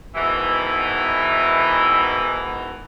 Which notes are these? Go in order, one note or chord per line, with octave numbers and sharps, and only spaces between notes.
G#2 B2 D#3 E3